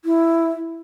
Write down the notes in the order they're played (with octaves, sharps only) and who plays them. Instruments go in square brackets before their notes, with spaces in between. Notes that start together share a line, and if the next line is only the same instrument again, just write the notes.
[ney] E4